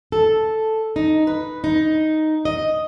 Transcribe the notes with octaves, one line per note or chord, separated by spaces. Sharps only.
A4
D#4
B4
D#4
D#5